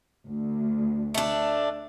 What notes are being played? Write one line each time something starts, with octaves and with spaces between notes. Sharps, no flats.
D2
A3 D4